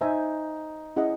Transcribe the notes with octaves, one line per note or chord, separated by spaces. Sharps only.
D#4 C5 E5 G#5
C#4 E4 G#4 D#5 F#5